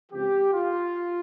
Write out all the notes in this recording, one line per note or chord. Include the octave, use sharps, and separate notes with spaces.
C#2 C#3 F3 C4 G4
F4